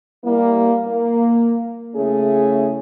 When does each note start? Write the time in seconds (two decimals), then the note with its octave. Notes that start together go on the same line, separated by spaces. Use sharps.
0.24 G3 A#3 E4
0.86 A#3
1.95 C#3 A3 C#4 E4 G#4